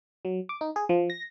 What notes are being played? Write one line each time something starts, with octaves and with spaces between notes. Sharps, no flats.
F#3
D6
D#4
G#4
F3
A#6